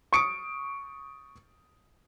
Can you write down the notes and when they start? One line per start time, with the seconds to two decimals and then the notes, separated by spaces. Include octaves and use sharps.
0.13 C#6 D#6 C#7 D7